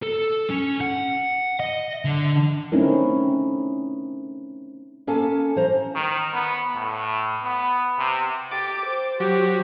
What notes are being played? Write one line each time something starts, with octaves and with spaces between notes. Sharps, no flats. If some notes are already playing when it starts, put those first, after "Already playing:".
A4
C#4
F#5
D#5
D3
A3 C4 C#4 D#4 E4 A#4
A#3 C#4 A4 F5 G#5 A5
E3 C5 A#5
D#3
B3
A2
B3
C3
G4 D6 A6
C5
F#3 G4